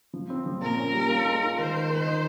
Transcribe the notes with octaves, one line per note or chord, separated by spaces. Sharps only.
F3
C4
F3
A#2 A#4
C#4
G3
F4
G#3
F4
D#3 C5
D#3
D#3
D#4